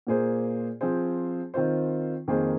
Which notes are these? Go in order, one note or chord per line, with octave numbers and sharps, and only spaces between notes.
A#2 A#3 G#4 C5
F3 C4 G#4 C5
D#3 C4 F4 C5
F2 D#3 A#3 G#4 C5